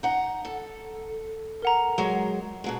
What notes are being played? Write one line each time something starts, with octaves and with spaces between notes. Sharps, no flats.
D#4 F#5 A#5
A4
A#4 F#5 A#5
F#3 G#3
B2 F#3 G#3